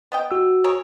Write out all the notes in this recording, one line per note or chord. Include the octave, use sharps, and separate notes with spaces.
B3 D#5 G5
F#4 E6
G#4 A#4 C#5